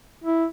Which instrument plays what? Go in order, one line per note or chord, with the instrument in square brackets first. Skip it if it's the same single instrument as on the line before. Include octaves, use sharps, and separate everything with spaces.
[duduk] E4